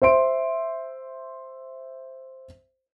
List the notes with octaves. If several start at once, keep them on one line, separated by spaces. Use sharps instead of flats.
C5 E5 C6 D7